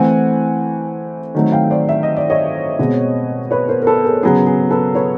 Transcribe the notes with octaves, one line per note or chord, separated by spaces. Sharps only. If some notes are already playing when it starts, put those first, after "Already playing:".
Already playing: E3 A3 C4 F#5 G#5
D#3 F#3 A3 C4
F5 G5
C5 D5
E5
D#5
D5
C#5 D#5
B2 G#3 C4
B4 C#5
A#4 C5
A#4
A4 B4
G#4 A#4
C#3 F#3 B3 G#4
G#4
A4 B4
B4 C#5